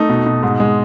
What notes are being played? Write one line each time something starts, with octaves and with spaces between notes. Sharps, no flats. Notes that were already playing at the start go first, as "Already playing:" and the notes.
Already playing: A3 D#4
B2
B2
G#2
G#3